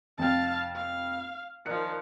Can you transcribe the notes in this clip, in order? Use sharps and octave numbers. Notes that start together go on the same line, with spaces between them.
F1 F2 F5 G5 A5
F5
D#3 F3 D5 F#6 C#7